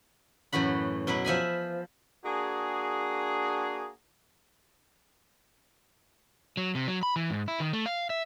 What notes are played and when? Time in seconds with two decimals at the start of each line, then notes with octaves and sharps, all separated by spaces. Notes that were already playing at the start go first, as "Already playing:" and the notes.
0.52 F#2 A2 E3 F#4 B5
1.07 B2 F#3 E4 B4
1.25 F3 E5 G#5 B5
2.26 A#3 D4 F#4 G#4
6.57 F#3
6.75 C3
6.88 F#3
7.03 B5
7.16 E3
7.30 G#2
7.48 E4
7.60 D#3
7.73 A3
7.86 F5
8.10 E5